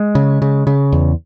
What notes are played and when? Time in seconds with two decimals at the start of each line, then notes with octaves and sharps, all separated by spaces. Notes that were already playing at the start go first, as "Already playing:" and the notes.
Already playing: G#3
0.15 C#3
0.42 C#3
0.67 C#3
0.92 E2